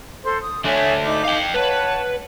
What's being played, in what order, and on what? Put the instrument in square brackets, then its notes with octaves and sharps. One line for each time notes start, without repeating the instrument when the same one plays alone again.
[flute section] A4 C5 C6
D#6
[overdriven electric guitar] A3 D4 [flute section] C#5 E5 G#5
[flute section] D#4 D6
[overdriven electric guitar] F5 G5
[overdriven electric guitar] B4 [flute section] C#5 F#5 A5